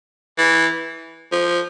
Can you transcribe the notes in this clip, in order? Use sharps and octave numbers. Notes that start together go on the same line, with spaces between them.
E3
F3